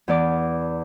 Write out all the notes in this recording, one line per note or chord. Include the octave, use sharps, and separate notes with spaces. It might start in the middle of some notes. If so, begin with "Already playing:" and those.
E2 B3 D5 D6